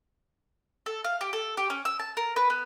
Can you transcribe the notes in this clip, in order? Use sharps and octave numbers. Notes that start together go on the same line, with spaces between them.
A4
F5
G4
A4
G4
C#4
E6
A5
A#4
B4
B3